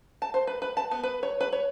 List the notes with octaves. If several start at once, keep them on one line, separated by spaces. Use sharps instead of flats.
A5
C5
B4
B4
A5
B3
B4
C#5
B4
C#5